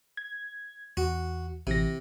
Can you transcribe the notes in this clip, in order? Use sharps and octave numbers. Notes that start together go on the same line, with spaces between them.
G#6
E2 F#4
A1 C3 E3 A#6